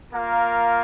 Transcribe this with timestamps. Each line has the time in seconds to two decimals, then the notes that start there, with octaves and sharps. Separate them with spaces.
0.13 A#3 F4 A#4 F5